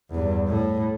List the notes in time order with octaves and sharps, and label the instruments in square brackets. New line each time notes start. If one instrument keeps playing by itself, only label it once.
[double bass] E2 G2
A2